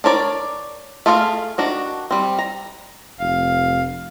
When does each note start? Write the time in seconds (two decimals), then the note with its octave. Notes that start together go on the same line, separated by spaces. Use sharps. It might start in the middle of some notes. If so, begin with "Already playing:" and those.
0.04 D4 A#4 C#5 D5
1.06 A3 F4 G#4 A4 F5
1.58 D#3 D4 F#4
2.11 G3 C4
2.39 A#5
3.19 F1 F5